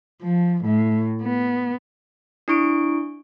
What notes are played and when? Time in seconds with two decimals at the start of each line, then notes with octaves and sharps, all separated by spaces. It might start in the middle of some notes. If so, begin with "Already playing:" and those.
0.22 F3
0.64 A2
1.23 B3
2.48 D4 E4 C#6 D7